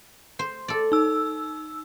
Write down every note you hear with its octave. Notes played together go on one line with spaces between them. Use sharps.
C5
A4 D5
D#4 E6